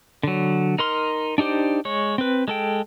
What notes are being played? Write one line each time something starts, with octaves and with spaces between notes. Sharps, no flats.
D3 F#3
D#4 A#4 C6 F6
D4 D#4 G4 C5 D5
G#3 C#5
C4 B4
G#3 A4 G5